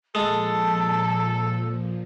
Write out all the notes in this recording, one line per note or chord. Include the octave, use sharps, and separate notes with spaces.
A#2 F3 G#3 A4 A5